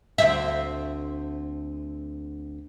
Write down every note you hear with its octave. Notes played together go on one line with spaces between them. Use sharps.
D2 C4 E5